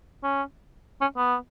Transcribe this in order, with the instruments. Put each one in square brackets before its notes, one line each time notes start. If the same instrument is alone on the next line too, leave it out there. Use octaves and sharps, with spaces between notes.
[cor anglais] C#4
C#4
B3